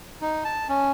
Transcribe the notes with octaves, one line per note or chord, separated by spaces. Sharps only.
D#4
A5
C#4